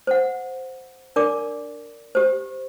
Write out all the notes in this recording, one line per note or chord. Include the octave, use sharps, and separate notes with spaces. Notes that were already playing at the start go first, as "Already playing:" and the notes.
C5 F#5
D4 A#4 D5 D6
G4 C5